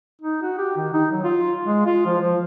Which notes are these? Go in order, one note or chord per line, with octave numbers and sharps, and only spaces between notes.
D#4
F#4
G4
D#3
D#4
F#3
F4
G#3
F4
F3
F3